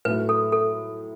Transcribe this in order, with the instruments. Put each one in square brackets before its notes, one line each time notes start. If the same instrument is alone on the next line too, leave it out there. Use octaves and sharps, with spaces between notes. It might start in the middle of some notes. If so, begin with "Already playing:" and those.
[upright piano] A2 F#3 A3 [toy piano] B4
[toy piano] A4
A4